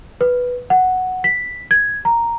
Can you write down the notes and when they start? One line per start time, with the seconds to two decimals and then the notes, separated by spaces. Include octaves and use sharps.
0.21 B4
0.70 F#5
1.24 B6
1.71 G#6
2.05 A#5